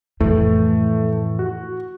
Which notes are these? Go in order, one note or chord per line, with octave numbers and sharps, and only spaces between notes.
F2 A2 E3 A3
F#4